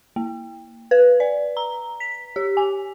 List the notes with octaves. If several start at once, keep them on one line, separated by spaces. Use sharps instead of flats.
A#3
B4
D5
A#5
B6
G4
G#5